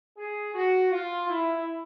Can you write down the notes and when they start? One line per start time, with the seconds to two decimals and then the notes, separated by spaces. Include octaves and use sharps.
0.17 G#4
0.54 F#4
0.91 F4
1.29 E4